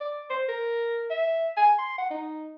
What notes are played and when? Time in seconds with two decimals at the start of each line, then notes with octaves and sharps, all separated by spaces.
0.01 D5
0.30 C5
0.48 A#4
1.10 E5
1.57 G#5
1.79 C6
1.98 F#5
2.11 D#4